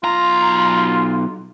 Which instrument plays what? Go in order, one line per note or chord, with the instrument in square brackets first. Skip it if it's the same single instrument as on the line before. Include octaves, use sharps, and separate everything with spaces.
[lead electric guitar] B1 A#5 [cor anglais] F4